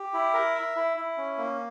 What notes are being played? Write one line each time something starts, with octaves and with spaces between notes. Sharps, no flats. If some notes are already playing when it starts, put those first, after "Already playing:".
Already playing: G4
E4
A#4
E5
E4
E4
C#4
A#3